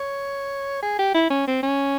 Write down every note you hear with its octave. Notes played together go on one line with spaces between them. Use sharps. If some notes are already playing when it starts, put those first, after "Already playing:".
Already playing: C#5
G#4
G4
E4
C#4
C4
C#4